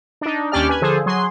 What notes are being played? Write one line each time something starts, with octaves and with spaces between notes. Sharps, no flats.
D4 D#4
D#2 C#4 D4 G4 D5 F6
B4 G#5
D3 F3 G#4 A4 C5
F#3 G#4 C6